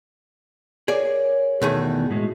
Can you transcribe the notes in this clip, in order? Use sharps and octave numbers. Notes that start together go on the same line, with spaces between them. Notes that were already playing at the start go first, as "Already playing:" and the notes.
G#4 A#4 C#5 D5 G#5
E2 B2 D#3 A3 G#4
A2 G#3 F#4